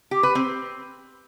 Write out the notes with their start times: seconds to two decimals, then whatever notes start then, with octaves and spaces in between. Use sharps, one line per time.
0.11 G4
0.23 B4
0.35 C4